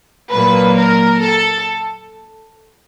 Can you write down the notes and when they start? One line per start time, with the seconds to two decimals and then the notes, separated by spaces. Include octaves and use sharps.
0.32 A#2 F#3 A#3 B4
0.77 A#4
1.20 A4